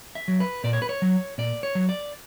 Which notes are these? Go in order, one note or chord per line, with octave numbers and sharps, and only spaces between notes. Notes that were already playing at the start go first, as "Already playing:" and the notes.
E5
F#3
B4
A#2 D5
C#5
B4
C#5
F#3
A#2 D5
C#5
F#3
D5